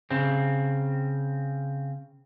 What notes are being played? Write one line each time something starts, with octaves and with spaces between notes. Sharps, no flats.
C#3 C4